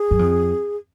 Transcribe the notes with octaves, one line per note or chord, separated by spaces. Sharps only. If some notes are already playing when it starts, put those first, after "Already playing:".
Already playing: G#4
F#2
F2